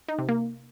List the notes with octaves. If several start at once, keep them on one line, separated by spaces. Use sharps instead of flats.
D#4
C3
A#3